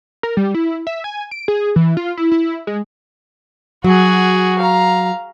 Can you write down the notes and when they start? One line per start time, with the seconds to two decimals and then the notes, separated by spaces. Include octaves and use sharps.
0.23 A#4
0.37 G3
0.55 E4
0.87 E5
1.04 G#5
1.31 D7
1.48 G#4
1.76 E3
1.97 F4
2.17 E4
2.32 E4
2.67 G#3
3.84 F#3 F#4 G#4
4.59 F5 A#5